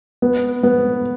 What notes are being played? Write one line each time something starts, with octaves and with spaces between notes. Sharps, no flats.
B3
B3